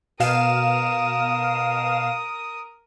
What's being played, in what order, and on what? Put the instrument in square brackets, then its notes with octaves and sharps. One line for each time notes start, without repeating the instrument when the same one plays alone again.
[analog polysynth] B2 F5 E7 [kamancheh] A#4 D#6